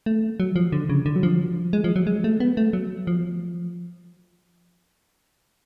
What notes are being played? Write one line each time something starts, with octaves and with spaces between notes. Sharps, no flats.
A3
F#3
F3
D3
C#3
D3
F#3
F3
G#3
F3
F#3
G#3
A3
B3
A3
F#3
F3